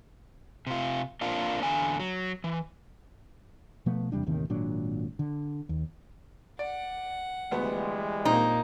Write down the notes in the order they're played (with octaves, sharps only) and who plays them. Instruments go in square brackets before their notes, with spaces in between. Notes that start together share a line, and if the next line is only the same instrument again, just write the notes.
[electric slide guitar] C3 F4
A#3 C4 D4 F4
E2 D3 G#5
F#3
E3
[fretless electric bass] B2 F3 A3 B3
E2 C3 G3 D4
A1 D#2 C3 D#3
G#1 A#2 F#3 D4
D3
D#2
[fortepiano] D5 [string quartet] F#5
[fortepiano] D2 B3 [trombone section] E3 G3 G#3
[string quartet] A#2 A#3 [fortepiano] C4 [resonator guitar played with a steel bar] D#4